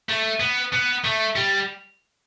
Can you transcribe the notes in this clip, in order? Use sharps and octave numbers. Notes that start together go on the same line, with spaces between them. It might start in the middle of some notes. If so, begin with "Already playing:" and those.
A3
B3
B3
A3
G3